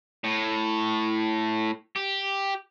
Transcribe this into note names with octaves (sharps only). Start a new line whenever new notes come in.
A2
G4